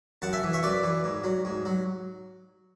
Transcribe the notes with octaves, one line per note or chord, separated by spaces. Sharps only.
F#2 F#5 A5
E5 G#5
E3
C#5 E5
F#2 B4 D5
E3
G#2
F#3
G#2
F#3